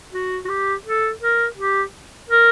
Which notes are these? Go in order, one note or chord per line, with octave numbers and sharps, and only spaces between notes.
F#4
F#4
G4
A4
A#4
G4
A#4